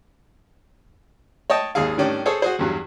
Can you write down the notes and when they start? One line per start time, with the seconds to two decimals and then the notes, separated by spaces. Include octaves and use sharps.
1.50 C#5 D#5 G5 A5
1.75 G#1 D#2 G#4 F5
1.98 A2 D#3 G3 C#4 D4
2.26 G#4 A4 C5 C#5
2.42 F#4 G#4 C5
2.59 E2 G2 F#3